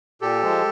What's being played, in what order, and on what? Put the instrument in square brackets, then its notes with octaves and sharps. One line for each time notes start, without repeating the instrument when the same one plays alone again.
[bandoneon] A#2 G4 A4
F3 G#3